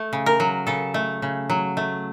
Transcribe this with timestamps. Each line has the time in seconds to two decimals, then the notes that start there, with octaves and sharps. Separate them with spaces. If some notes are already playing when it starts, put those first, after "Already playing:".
Already playing: A3
0.13 C#3
0.26 A#4
0.40 F#3
0.67 C#3 A4
0.94 A3
1.22 C#3
1.50 F#3
1.77 A3